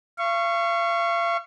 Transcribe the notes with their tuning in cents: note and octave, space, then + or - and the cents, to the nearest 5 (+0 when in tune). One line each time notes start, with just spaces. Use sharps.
F5 -40 C#6 -5